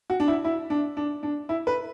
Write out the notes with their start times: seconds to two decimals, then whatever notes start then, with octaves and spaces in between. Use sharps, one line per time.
0.10 F#4
0.20 D4
0.28 E4
0.44 E4
0.70 D4
0.97 D4
1.23 D4
1.49 E4
1.67 B4